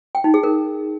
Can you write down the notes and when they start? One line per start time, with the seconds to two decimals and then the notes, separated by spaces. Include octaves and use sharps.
0.15 G5
0.24 D#4
0.34 G#4
0.43 A#4